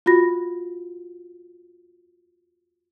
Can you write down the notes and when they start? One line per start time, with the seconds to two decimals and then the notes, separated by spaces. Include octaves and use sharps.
0.06 F4 F#4 B5 A#6